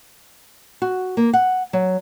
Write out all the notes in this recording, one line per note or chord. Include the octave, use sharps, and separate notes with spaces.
F#4
A#3
F#5
F#3